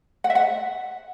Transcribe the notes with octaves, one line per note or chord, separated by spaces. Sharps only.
F#5
E5
F#5